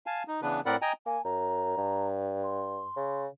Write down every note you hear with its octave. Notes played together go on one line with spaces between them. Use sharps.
F5 G#5 A5
D#4
C#3 E3 B3 D4 B4
A2 C4 A#4 D5 F#5 B5
D#5 G5 G#5 A#5
A#3 G#5
F#2 A#5
G2
C6
C#3